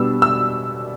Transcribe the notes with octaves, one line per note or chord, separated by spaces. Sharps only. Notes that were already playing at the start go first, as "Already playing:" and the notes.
Already playing: B2 G3 B3 D4 E6
E6